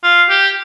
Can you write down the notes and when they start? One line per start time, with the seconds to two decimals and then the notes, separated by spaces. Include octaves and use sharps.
0.03 F4
0.30 G4